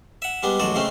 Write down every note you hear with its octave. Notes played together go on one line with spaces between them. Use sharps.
E5 F#5
G3 G#3 B3 D4
A1 F#2 G#3 F#4 A4 D5
C#3 G#3 A3 C4 C#4